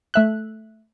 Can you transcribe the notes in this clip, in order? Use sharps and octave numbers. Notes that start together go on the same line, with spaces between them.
A3 E5 F#6